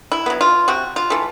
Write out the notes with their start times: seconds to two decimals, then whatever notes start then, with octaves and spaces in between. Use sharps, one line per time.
0.12 E4
0.26 F#3 B3
0.41 F4
0.68 C3 F#4
0.96 F4
1.10 E3 A3